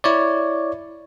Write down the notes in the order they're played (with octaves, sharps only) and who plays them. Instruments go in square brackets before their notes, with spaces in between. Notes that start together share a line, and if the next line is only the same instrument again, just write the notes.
[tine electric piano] E4 C#5 D5